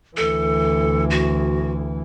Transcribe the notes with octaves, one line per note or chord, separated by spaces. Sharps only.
D2 E3 A4
F#4